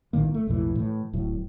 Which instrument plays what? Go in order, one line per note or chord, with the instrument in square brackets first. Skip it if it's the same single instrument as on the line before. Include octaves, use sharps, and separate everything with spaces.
[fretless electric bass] A#1 A2 D#3 A#3
A3
B1 F2 A2 E3
A2 E3
D1 A2 F#3